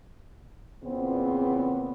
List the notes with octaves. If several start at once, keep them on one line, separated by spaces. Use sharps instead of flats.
E2 A#2 C#3 B3 C4